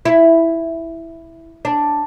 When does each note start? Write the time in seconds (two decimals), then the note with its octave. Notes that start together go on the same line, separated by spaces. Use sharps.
0.05 E4
1.65 D4